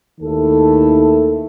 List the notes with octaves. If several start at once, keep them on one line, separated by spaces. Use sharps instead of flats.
D#2 D#3 A3 E4 A4